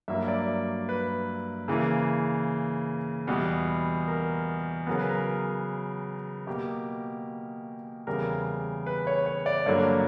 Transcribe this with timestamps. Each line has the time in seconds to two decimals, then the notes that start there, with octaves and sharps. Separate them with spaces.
0.08 G2 F#3 A#3 E5
0.28 D5
0.89 B4
1.68 C#3 E3 A#3
3.27 E2 B2 G3 B3
4.08 A#4
4.87 C#3 F#3 B3 A#4
4.99 B4
5.09 A#4
6.47 B2 A#3 G4
8.07 E2 C#3 G3 B3 A#4
8.87 B4
9.07 C#5
9.26 C#5
9.46 D5
9.66 G2 D3 F#3 A#3 C#5